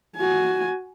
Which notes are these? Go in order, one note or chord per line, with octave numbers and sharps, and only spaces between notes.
F#4 G#5